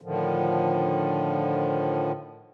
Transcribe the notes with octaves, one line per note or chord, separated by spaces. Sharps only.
A2 D3 D#3 F3